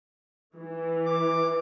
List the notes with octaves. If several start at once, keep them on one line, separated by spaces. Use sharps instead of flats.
E3
D6